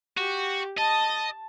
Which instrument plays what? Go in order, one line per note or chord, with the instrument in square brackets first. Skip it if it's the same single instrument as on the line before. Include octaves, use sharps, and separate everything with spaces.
[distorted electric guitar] F#4 [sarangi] G4
[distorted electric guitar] D#5 [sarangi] A5